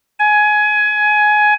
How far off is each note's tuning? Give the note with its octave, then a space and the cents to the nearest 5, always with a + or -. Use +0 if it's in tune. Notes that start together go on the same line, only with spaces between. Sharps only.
G#5 +20